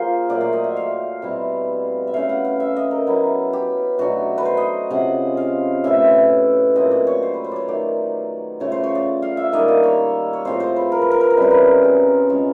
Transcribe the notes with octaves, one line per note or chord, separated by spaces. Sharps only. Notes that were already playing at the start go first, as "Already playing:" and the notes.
Already playing: F3 A#3 F4 G#4 C5
A#2 F#3 A3 D5
D5
D#5
E5
F5
B2 G3 C4 E4
E5
E3 A3 C#4 E4 F5
F#5
F5
E5
D#5
A#4
F#3 B3 E4
G4
B2 F#3 A3 D4 F#4
B4
C5
D#5
C3 F3 G#3 C#4 F#5
F5
A2 E3 A3 E5
A#2 F#3 A3 C4 D#5
D5
C#5
C5
B4
C5
C#5 D5
D#3 F#3 A3 D5
C#3 F3 A3 C#5
C5
C#5
D5
F5
E5
D#3 G3 A#3 D4 D#5
D5
C#5
C#5
A2 F3 G#3 C4 C5
C5
B4
A#4
B4
A#4
B4
A#4
C#3 E3 G3 C4 B4
A#4
G#4
B2 G#3 C#4 F4